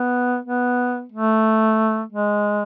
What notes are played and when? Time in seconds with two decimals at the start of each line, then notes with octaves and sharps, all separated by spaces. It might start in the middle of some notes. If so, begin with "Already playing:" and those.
Already playing: B3
0.45 B3
1.12 A3
2.12 G#3